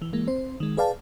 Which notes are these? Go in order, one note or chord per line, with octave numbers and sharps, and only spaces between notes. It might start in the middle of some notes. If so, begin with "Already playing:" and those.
E3
E3 G#3 A#3
C4 C5
D#3 G#3
G#4 B4 D5 F5 G5 A5